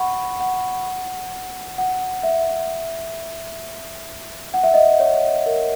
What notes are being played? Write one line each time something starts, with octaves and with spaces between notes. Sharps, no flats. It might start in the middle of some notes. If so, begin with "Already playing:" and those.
Already playing: F#5 B5 C#6
F#5
F#5
E5
F#5
E5
D#5
E5
C#5
A#4